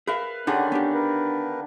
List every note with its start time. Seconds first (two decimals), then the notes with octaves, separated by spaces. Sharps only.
0.07 G#4 A#4 B4 E5 F5
0.47 D3 D#3 C#4 D#4 G4 G#4 D5
0.72 B3 D4 G4
0.94 A#4 B4